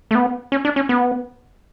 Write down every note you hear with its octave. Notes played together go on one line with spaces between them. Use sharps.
A3
B3
C#4
D4
C#4
B3